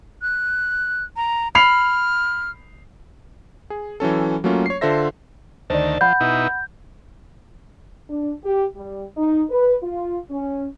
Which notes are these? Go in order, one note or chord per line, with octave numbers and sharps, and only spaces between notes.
F#6
A#5
B5 F6 C7 F7
G#4
E3 F#3 C#4 A4
F#3 A3 A#3 C#4 F4
C#5 C7
D3 F4 A4 C5 E5 A#6
D2 D#3 C5 D5 A5
F3 F#5 B5 G6
B2 D#4 E4
D4
G4
G3
D#4
B4
F4
C#4